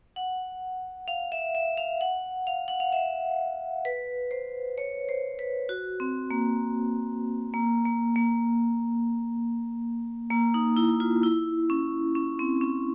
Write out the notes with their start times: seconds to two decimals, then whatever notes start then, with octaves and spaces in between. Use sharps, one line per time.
0.16 F#5
1.08 F5
1.32 E5
1.55 E5
1.78 F5
2.01 F#5
2.47 F5
2.68 F#5
2.80 F5
2.92 E5
3.85 B4
4.31 C5
4.78 C#5
5.09 C5
5.39 B4
5.69 F#4
6.00 C4
6.31 A#3
7.54 A#3
7.85 A#3
8.16 A#3
10.30 A#3
10.54 D#4
10.77 E4
11.00 F4
11.23 E4
11.70 C#4
12.15 C#4
12.39 C4
12.61 C#4